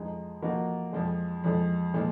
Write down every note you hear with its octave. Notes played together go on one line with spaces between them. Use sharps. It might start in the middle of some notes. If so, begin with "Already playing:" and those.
Already playing: F2 F3 G#3 D#4
F3 A#3 D#4 F#4
F2 F3 G#3
F2 F3 G#3
A#2 F3 G#3